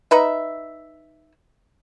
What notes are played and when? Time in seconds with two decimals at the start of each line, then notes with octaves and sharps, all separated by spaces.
0.11 D#4 B4 E5